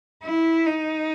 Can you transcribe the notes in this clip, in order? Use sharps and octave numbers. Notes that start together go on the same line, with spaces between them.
E4
D#4